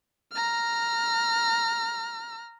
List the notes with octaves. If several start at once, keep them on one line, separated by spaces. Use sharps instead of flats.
A#5 F6